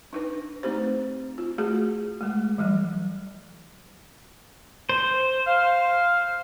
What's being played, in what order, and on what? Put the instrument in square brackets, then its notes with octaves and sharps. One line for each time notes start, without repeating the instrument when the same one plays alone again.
[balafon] D4 D#4 B4
A3 C4 D#4 G4 C5
F4
A3 F#4 G#4
G#3 A3
E3 F#3 G3
[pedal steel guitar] C5
[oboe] F5